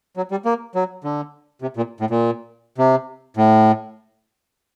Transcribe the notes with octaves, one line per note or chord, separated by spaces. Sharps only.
F#3
G3
A#3
F#3
D3
C3
A#2
A2
A#2
C3
A2